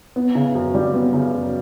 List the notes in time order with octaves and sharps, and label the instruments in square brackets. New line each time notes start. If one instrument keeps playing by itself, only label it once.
[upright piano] B3
C#3
F#2
G3
B3
C#3
F#2